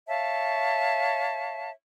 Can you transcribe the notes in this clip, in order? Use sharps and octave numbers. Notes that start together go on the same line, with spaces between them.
C#5 E5 F5 A5